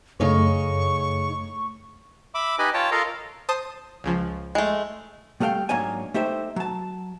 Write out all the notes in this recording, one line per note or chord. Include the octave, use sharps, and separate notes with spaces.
F#2 C#3 A3 D#4 C#5 C#6
E5 B5 D6
D#4 G4 B4 D#5 G#5 B5
F4 C#5 G5 A5
F4 A4 A#4 D#5 F5
C5 A5 D#6
C#2 C#3 F3
G#3 A3
G3 A3 A4 F5 G5
G#2 F#3 A#3 D4 C#5 G#5
A3 D#4 G4 C5 E5
F#3 A5